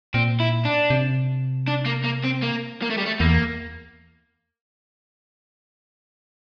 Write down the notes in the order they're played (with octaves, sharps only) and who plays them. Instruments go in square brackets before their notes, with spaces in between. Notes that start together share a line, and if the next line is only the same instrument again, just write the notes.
[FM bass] A#2 [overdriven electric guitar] C4
[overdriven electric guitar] E4
D4
[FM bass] C3
[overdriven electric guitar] D4
A#3
A#3
C4
A#3
A#3
A3
G3
A3
[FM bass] E2 [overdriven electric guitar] A#3